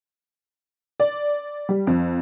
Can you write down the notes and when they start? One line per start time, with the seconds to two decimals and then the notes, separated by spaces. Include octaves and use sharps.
1.00 D5
1.69 G3
1.87 F2